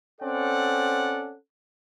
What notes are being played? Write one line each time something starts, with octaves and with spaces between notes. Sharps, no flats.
C4 C#4 A4 D5 F#5